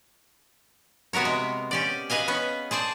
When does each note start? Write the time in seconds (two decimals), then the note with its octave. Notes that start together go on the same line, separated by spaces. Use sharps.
1.13 C3 B3 F#4 A#4 C#5
1.25 G#3
1.71 C#4 G4 D5
2.10 G#4 B4 D#5 F5 G#5
2.28 B3 C#4 B4
2.71 G#4 C5 D5 A5